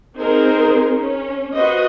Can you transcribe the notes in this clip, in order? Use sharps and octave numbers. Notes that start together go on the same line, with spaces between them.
C4 D#4 G#4 A#4 C5
C#4
F#4 B4 C5 D#5